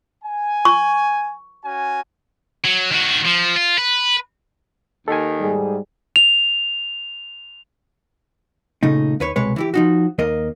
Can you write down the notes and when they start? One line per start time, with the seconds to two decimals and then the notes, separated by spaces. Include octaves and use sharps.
0.23 G#5
0.65 C#6
1.63 C#4 F#4 G#5
2.65 F#3
2.92 D#3 F#4
3.26 F3
3.55 F4
3.78 B4
5.08 D#2 D#3 A4 G#5
5.41 G#2 G3 G#4
6.16 F7
8.83 A#2 C#3 A3 D#4
9.20 D#2 B4 C#5
9.36 C2 B2 G#3 B4 C#5
9.56 E3 E4 G4
9.74 F3 D#4 F#4
10.18 D#2 A#3 A#4 D#5